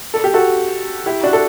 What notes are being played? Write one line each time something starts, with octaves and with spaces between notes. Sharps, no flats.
A4
G4
F#4 A4
E4 G4
D4 F#4
A4